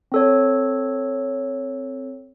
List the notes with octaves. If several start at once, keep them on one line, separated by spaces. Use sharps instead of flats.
C4 A4 C#5